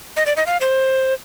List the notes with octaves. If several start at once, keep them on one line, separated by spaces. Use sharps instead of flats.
D#5
D5
D#5
F5
C5